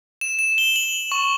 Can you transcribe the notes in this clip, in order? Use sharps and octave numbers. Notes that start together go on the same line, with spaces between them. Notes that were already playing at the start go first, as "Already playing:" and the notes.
E7
E7
G7
F#7
C#6